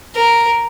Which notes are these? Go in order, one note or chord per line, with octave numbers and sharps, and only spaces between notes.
A#4